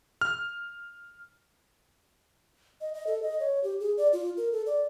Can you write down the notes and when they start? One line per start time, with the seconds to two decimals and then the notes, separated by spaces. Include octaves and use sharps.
0.21 F6
2.81 D#5
2.94 D#5
3.07 A4
3.22 D#5
3.40 C#5
3.64 G4
3.80 G#4
3.97 D5
4.13 F4
4.37 A#4
4.52 A4
4.66 D5